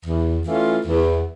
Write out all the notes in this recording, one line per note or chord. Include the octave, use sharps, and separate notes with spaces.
E2
E3 A3 C#4 F4
E2